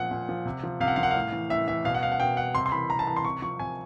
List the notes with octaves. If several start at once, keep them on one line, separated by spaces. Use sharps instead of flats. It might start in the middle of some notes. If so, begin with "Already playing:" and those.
Already playing: A#2 F3 F#5
A#2
F3
C3
F3
C3 F5
F#5
F3 F5
F#5
A2 F5
E3
A2 E5
E3 E5
B2 F5
F#5
F5
F#5
B2 G5
F#5
C3 C6
C6
E3 B5
C3 A#5
A5
E3 A#5
C6
C3 C#6
F3 C#6
C3 G#5